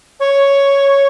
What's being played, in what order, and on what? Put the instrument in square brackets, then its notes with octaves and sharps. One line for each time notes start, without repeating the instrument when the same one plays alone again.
[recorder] C#5